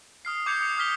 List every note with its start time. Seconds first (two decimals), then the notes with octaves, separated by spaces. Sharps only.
0.25 D#6 F6 C7
0.46 D6 G6 G#6 C#7 F7
0.61 D#6 C#7
0.77 D6 D#6 F6 B6 G7